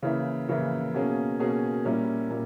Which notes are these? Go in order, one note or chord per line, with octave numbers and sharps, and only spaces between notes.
C#3 E3 A#3 E4
C#3 E3 A#3 E4
B2 A#3 C#4 G#4
B2 A#3 C#4 G#4
A#2 G3 C#4 E4 A#4
A#2